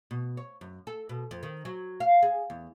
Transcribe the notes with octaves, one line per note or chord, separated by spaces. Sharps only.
B2
C#5
F#2
A4
B2
F2
D#3
F#3
F5
G#4
E2